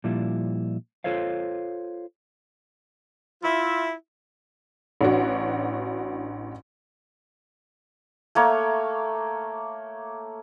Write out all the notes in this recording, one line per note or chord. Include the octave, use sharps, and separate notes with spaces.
A#2 F3 G3 E4
F4 A4 C5 C#5 F5
E4 F4 E5
A1 D4 F#4
A3 A#3 C#5